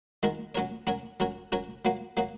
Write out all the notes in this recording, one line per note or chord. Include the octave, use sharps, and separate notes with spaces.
D#3 G#3 F#4 A#4
F#3 C#4 F#4 A#4 C#5
F#3 C#4 F#4 A#4 C#5
F#3 C#4 F#4 A#4 C#5
F#3 C#4 F#4 A#4 C#5
F#3 A#3 F#4
F#3 A#3 F#4